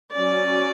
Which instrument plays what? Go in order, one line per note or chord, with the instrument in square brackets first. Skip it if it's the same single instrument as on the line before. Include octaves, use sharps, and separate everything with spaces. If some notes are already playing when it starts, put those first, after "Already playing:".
[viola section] F#3 C#4 D5